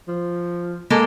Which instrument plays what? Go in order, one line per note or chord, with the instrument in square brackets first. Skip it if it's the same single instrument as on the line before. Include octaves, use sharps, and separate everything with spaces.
[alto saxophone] F3
[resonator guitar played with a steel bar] G#3 A#3 A4